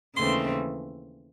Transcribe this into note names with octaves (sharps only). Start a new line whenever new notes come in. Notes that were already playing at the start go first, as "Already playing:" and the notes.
D#2 C#3 E3 A3 C4 C6